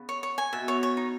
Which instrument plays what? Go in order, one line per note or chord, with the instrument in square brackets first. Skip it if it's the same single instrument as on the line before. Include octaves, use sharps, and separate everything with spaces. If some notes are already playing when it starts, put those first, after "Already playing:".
Already playing: [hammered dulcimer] C#3 B3
[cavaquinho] C#5
C#5
G#5
[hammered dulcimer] B2 [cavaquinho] E5
[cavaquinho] C#5
C#5
D#4